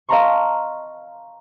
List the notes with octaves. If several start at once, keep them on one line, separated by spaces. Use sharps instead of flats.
D#5 F5 A5 A#5 C6 C#6